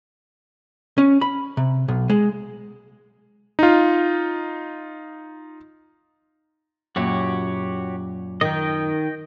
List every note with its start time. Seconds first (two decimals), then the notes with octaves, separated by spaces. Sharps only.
0.98 C#4
1.21 B5
1.57 C3
1.88 B1
2.10 G#3
3.59 D#4 F4
6.96 F#2 A#2 F#4 G4 C#5
8.41 D#3 D#5 G5